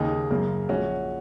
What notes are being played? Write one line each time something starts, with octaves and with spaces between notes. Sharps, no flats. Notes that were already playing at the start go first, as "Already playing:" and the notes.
Already playing: D#2 C#3 A#3 D#4 G#4
F#2 C#3 A#3
A#1 A#2 G#3 C#4 F#4